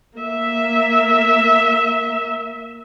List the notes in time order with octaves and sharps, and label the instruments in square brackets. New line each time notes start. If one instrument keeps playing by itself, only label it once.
[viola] A#3 E5